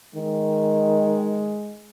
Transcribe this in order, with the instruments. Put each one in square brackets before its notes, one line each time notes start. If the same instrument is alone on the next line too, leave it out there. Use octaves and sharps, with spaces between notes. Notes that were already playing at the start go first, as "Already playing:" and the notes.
[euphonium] D#3 [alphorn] G#3